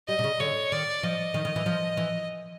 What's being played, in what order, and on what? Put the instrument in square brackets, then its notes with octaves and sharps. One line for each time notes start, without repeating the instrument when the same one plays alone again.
[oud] G3 [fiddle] D#5
[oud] C3
C#3
[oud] D3 [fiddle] C#5
[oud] D#3 [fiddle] D5
[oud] F3 [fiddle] D#5
[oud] D#3
D#3
E3
F3
E3